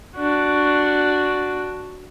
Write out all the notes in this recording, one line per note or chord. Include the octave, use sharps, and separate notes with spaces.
D4 F#4